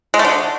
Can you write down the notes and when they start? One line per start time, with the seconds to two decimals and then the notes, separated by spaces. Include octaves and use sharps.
0.14 G#3
0.19 A3
0.25 D3